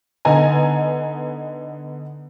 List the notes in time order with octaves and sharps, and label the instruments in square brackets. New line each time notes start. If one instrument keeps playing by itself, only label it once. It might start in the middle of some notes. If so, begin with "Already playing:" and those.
[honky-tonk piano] D3 B3 D#4 G#5 A#5